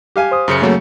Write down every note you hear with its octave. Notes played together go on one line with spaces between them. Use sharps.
G4 F5 G#5
C5 D#6
F#2 C#3 C#7
C#3 F#3 A3 A#3 C#5